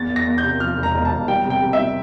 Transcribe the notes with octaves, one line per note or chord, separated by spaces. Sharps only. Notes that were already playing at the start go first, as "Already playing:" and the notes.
Already playing: E2 A6
E2
A#6
E2
G6
C3
F3 F6
E1
A#5
E1
A5
E1
G3 G5
C3
G5
C3
E5
G3